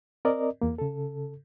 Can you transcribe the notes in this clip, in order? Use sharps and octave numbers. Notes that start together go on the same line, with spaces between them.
C4 A#4 D5 D#5
E2 A#3
C#3 A4